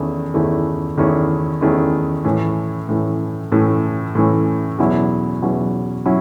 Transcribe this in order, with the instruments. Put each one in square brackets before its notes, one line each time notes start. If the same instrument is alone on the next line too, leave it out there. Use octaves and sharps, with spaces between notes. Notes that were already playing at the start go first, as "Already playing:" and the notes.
Already playing: [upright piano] E2 D#3 A3 C#4 E4
E2 D#3 A3 C#4 E4
E2 D#3 A3 C#4 E4
E2 D#3 A3 C#4 E4
A2 E3 A3 C#4
A2 E3 A3 C#4
A2 E3 A3 C#4
A2 E3 A3 C#4
E2 B2 F#3 C#4 E4
E2 B2 F#3 C#4 E4
F#3 C#4 E4